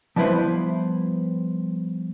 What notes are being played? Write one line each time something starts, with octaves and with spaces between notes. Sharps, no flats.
F3 G3 B3 E4 B4 C5